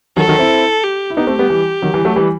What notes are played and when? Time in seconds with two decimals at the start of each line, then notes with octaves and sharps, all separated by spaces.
0.17 D#3 F#3 A4
0.28 D#3 F#3
0.39 C4 E4
0.84 G4
1.10 E4
1.17 B3 D#4 G4
1.27 A3 C4
1.39 G3 B3
1.50 E3 G3
1.82 D#3 F#3
1.94 E3 G3
2.05 F#3 A3
2.16 E3 G3